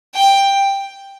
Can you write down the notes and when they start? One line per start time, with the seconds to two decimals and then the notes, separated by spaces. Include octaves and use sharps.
0.15 G5